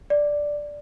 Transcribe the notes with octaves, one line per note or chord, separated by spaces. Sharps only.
D5